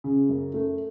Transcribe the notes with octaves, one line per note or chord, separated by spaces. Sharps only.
C#3
F#2
A3